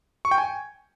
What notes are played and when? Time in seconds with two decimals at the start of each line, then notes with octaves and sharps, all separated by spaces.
0.25 C#6
0.31 G5
0.38 G#5